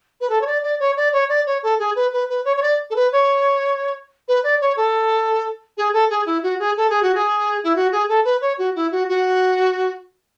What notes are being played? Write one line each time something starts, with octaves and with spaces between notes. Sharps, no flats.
B4
A4
C#5
D5
D5
C#5
D5
C#5
D5
C#5
A4
G#4
B4
B4
B4
C#5
C#5
D5
A4
B4
C#5
B4
D5
C#5
A4
G#4
A4
G#4
E4
F#4
G#4
A4
G#4
F#4
G#4
E4
F#4
G#4
A4
B4
C#5
F#4
E4
F#4
F#4